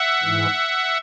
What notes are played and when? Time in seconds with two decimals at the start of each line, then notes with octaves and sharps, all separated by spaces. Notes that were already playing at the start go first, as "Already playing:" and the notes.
Already playing: E5 F#5
0.22 G#2 E3